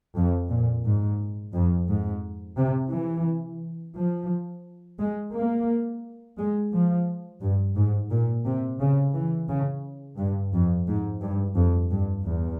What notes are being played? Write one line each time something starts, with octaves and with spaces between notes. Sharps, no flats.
F2
A#2
G#2
F2
G#2
C3
E3
F3
G#3
A#3
G#3
F3
G2
G#2
A#2
C3
C#3
E3
C#3
G2
F2
G#2
G2
F2
G2
E2